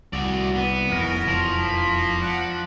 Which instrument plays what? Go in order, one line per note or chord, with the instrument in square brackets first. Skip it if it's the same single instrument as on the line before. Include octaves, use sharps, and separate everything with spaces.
[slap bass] C2 [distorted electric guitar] F#4 D5
[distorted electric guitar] B3
[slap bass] E1 F2 E3 [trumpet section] C#4 A#4
[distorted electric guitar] F3
[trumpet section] A#3 A#5 B5
D5 F#5